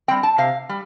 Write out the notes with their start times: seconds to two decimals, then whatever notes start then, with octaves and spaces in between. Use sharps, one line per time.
0.08 C4 G5
0.11 G3
0.23 A5
0.38 C3 F5
0.69 G3